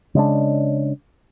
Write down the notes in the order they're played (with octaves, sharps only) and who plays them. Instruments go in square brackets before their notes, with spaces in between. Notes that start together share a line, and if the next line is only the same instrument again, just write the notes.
[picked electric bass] C#3 G#3 D4